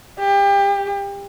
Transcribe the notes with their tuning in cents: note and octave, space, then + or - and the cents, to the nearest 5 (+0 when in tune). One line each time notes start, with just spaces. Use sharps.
G4 +30